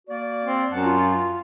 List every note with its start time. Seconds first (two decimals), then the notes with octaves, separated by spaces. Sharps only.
0.08 A#3 F#4 D5
0.45 C4
0.72 F#2 F#5 A5
0.83 F4